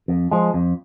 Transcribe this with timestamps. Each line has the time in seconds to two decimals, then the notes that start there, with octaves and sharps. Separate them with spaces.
0.08 F2
0.31 F3 G#3
0.54 F2